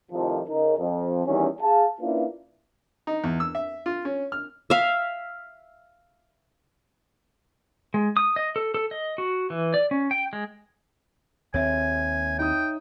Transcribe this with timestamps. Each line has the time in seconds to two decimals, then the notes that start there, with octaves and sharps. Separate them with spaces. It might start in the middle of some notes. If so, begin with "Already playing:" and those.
0.12 F2 A2 C3 D#3 F3
0.49 C#3 D#4 A#4
0.79 F2
1.26 E2 D#3 E3 G3 C#4
1.62 G#4 F5 A5
2.01 A#3 C#4 D4 E4 F4 B4
3.07 D#4
3.24 E2
3.40 E6
3.55 E5
3.86 F4
4.05 C#4
4.32 F6
4.70 E5 F5
7.94 G#3
8.17 D#6
8.36 D#5
8.56 A4
8.74 A4
8.91 D#5
9.18 F#4
9.50 E3
9.74 D5
9.91 C#4
10.11 G5
10.33 G#3
11.54 D#2 C4 C#5 E5 G#5
12.39 D#4 G5 D#6